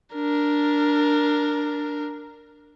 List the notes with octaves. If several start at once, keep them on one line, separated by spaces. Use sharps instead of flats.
D4 A#4